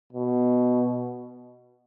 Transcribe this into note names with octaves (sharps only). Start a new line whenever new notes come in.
B2